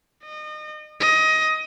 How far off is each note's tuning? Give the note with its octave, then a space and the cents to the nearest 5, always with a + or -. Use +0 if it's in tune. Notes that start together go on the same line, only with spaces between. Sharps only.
D#5 -30
D#5 +20